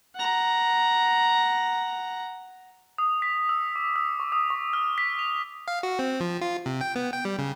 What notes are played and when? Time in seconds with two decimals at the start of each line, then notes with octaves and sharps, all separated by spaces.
0.16 F#5 A#5
2.98 D#6
3.22 B6
3.49 E6
3.76 D6
3.96 E6
4.20 C#6
4.32 D#6
4.50 C#6
4.73 F6
4.98 B6
5.19 F7
5.68 F5
5.83 F#4
5.99 C4
6.20 F3
6.41 F4
6.66 C3
6.81 G5
6.95 B3
7.13 G5
7.25 G3
7.39 C#3